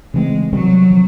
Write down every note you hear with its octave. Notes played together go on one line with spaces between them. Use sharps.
C#3 E3 G#3 A3 C4
C3 D#3 F#3 G3 C4
C3 F3